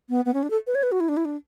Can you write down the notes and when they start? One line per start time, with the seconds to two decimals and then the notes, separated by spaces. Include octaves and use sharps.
0.09 B3
0.25 B3
0.34 C#4
0.43 D4
0.50 A4
0.67 B4
0.75 C#5
0.83 B4
0.92 F#4
1.00 E4
1.08 D4
1.17 E4
1.25 D4